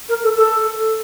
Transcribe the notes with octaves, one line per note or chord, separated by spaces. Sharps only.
A#4
A4
A4